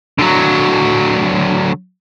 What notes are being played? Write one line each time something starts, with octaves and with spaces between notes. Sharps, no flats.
D3 F#3